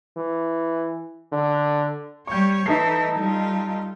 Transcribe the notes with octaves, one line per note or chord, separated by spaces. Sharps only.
E3
D3
G3 C#5 C#6 G6
E3 D#4 A4 C7
G3 F4